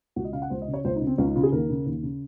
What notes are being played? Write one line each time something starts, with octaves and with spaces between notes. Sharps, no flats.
C#2 F#4
D#5
C#3 F5
F#5
C#2 C5
D#5
C#3
C#5
C#2 C5
D#4
C#3
C4
C#2 C#4
D#4
C#3 F4
G#4
D#2 A#4
C#3
D#2
C#3